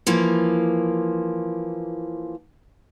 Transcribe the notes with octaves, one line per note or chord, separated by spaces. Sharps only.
E3 F3 A#3